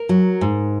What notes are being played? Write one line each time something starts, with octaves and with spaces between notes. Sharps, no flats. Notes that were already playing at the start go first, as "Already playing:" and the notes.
Already playing: A#4
F#3
G#2